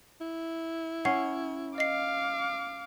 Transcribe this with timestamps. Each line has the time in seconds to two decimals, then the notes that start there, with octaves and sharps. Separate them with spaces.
0.21 E4
1.05 C#4 F#5 C7
1.78 D#5 F5 D6 C7